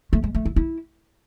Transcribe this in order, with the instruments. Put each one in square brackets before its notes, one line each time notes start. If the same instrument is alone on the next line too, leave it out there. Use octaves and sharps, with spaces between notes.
[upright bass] A3
G#3
A3
E4
E4